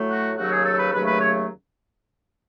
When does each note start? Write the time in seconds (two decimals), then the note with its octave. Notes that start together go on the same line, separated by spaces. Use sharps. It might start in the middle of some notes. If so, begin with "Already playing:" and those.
Already playing: A2 F#3 A3
0.11 F#4
0.37 D#2 C#3 F#3 A3 F#4
0.52 G#4
0.65 A4
0.79 B4
0.93 D#2 C#3 F#3 A3 B4
1.07 B4
1.20 C#5